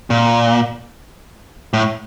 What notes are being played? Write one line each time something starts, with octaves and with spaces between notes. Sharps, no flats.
A#2
A2